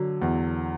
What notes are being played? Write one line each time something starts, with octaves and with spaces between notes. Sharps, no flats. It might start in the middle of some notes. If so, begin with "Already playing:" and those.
Already playing: D3 F#3
E2